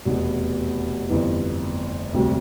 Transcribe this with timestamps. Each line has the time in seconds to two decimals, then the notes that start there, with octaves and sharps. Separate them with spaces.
0.05 F1 E2 B2 B3
1.09 G1 F2 E3 B3
2.13 E1 D2 C3 G3